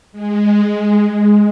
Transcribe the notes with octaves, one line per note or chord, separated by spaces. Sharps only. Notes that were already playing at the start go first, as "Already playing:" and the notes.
G#3